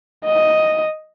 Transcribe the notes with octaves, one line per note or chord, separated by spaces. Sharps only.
D#5